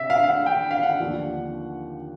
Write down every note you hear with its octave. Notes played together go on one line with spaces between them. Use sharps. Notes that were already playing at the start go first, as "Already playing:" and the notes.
Already playing: C3 E5
F5
F5
F#5
G5
F5
F#5
D#2 D3 F3